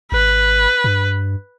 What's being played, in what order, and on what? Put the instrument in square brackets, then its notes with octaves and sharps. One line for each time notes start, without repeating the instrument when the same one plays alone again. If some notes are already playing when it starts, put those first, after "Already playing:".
[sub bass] G#1 [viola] B4
[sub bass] G2